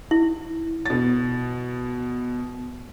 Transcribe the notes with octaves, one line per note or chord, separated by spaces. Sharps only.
E4
B2 A6